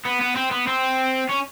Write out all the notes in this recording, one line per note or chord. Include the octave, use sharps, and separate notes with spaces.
B3
B3
C4
B3
C4
C#4